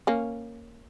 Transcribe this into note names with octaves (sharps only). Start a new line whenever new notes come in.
A#3 C#4